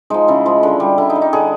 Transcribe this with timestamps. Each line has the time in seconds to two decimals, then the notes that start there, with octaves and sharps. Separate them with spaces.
0.10 F3 G#3 D#4
0.28 C#3 E4
0.46 F3 G#3
0.63 D3
0.80 G3
0.98 D3 E4
1.10 D#4
1.16 G3
1.22 D#4
1.33 D3 G#4